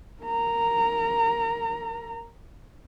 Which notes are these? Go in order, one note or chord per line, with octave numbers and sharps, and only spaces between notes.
A#4 A#5